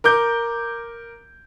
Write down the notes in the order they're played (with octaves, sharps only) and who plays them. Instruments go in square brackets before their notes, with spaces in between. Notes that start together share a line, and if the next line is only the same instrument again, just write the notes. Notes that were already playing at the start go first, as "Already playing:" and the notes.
[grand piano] A#4 D6 G6